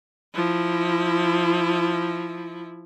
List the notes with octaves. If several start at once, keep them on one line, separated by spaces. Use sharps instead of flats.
F3 E4